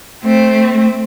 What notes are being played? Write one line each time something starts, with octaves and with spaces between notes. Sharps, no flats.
A3 C4